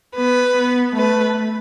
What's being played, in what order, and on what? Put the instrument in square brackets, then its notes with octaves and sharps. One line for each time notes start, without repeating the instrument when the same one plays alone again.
[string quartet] B3 [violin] B4
[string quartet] B3
[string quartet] A3 [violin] B4